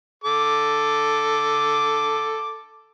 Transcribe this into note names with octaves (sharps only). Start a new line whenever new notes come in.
A4 D6